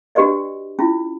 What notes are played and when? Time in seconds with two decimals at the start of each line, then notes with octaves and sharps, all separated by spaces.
0.15 D4 F#4 G4 B4 D5 D#5
0.79 C#4 E4 F4